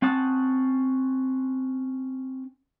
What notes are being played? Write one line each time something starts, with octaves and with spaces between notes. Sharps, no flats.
C4 C#4 F#5 A5 D#6